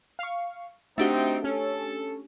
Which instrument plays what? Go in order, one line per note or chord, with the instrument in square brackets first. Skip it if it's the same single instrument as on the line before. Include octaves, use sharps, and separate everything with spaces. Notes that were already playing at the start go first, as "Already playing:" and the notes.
[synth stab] F5 C#6
[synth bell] A3 D4 G4 [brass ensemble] C4 D#4 [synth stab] F#4 E5
[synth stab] C#4 [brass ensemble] A4